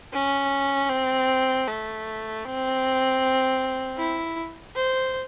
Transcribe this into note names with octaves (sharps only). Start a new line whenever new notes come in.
C#4
C4
A3
C4
E4
C5